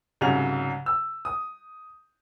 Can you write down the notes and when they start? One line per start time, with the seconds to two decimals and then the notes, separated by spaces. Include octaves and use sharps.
0.21 C2 G#2 C#3 F#3 F7
0.86 E6
1.25 D#6